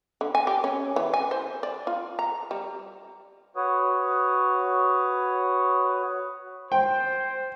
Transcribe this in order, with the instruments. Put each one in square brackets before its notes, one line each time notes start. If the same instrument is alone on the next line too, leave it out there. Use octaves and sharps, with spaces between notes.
[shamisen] D3
G#5
G4
C#4
E3
G#5
C5
D5
F4
A#5
G3
[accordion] F#4 B4 C#5 D#6
[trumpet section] C5 [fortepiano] G5